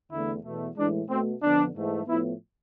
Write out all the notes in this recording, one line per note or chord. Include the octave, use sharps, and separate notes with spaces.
E2 D3 A3 E4
E2 B2 A3
A2 E3 G#3 D4
B2 A3 C4
F2 D3 F3 B3 D4
G#2 E3 A3
A2 F3 B3 E4